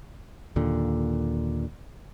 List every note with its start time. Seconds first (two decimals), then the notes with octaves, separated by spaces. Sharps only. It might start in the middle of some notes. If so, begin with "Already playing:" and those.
0.56 D#2 A#2 D3